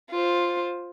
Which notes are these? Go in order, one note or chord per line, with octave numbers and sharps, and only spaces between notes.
F4 C5